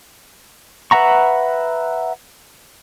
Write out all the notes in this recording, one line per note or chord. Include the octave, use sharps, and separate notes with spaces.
B4 E5 F#5 A#5 C#6